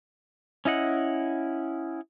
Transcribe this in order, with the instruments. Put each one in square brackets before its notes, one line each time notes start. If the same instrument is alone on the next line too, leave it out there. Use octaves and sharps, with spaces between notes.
[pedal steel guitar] C#4 E4 D#5 F#5